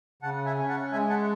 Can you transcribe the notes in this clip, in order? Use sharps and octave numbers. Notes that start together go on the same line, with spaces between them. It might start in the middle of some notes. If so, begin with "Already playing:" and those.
C#3 F#5 A5
E5 G#5
C#4
F#5 A5
G#3 E5 G#5
F#5 A5